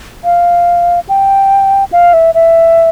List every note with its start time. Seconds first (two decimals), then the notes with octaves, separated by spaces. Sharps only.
0.24 F5
1.09 G5
1.92 F5
2.13 E5
2.35 E5